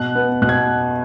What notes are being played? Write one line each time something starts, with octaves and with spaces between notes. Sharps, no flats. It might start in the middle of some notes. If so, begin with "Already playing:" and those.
Already playing: B2 F#6
B3
B2 F#6
G#6